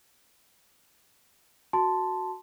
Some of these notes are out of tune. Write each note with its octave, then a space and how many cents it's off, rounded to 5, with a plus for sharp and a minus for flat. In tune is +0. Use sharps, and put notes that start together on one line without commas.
F#4 +0 A5 +0 C6 -5